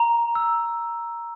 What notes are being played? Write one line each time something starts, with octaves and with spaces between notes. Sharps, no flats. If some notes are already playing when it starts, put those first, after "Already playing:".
Already playing: A#5
E6